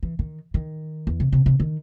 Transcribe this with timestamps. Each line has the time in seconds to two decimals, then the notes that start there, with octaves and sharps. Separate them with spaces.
0.03 E3
0.19 D#3
0.54 D#3
1.07 E2
1.20 C3
1.32 C3
1.46 C3
1.60 D#3